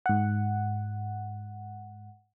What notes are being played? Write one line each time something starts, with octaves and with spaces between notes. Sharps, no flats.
G#2 F#5